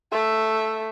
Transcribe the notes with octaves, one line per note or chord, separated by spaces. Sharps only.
A3 E5